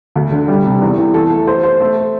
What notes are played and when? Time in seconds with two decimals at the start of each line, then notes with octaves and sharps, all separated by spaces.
0.16 D2
0.31 D3
0.48 G3
0.65 C3
0.82 E2
0.98 E3
1.14 A4
1.30 A3
1.47 C5
1.63 C5
1.81 A3